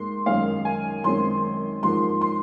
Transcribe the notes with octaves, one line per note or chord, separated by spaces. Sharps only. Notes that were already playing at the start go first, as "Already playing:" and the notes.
Already playing: G#2 A#3 C6
F#2 D#3 G#3 F5
G#5
F#2 D#3 G#3 C4 C6
G#2 F3 A#3 C6
C6